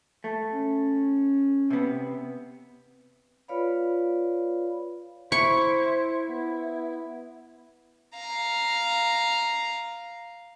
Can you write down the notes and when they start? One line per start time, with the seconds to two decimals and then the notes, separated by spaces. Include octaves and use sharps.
0.24 A3
0.52 C#4
1.70 C3 B3
3.48 F4 B4 C#5 D5 F5 B5
5.32 E4 C5 C#6
6.29 B3
8.15 F5 A#5